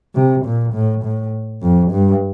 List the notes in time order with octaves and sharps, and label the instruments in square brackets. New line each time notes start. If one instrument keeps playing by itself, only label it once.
[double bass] C3
A#2
A2
A2
F2
G2